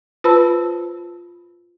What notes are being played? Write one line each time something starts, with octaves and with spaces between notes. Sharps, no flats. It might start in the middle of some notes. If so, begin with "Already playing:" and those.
F4 B4 C5 A5 B5 E6